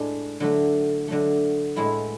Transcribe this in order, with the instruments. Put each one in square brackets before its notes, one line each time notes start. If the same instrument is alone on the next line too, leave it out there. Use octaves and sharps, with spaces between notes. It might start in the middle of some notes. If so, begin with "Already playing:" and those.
Already playing: [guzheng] A2 G#3 D4
D3 F#3 A3
D3 F#3 A3
A2 G#3 B3 E4